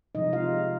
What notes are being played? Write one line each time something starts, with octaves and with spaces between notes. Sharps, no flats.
C3 F3 G#3 D#4 D#5
F4 F5